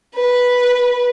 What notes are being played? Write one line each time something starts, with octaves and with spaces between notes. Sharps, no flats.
B4